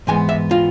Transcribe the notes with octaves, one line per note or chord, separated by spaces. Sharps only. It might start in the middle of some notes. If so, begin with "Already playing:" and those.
G#2 E3 G#3 B3 G#5
E5
F4